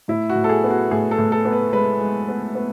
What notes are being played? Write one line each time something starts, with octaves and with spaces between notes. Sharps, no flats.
A2 E4
F#4
A2
A4
G#4
B3
F#4
A2 G#4
A4
A2
A4
B3
B4
G#3 B4
G#3
B3
B3